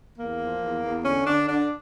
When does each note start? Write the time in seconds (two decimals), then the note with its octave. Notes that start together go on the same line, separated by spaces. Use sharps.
0.18 E2 A#3
0.40 F3
0.62 E2
0.83 E2
1.05 D3 C#4
1.26 D3 D4
1.48 D3 D4